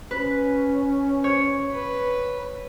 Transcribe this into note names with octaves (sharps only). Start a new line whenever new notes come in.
C#4 B4
C#5
B4